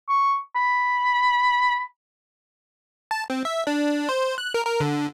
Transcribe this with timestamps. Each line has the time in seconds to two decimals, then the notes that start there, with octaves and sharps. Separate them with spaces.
0.09 C#6
0.56 B5
3.11 A5
3.30 C4
3.45 E5
3.67 D4
4.09 C5
4.38 F#6
4.54 A#4
4.66 A#4
4.80 D3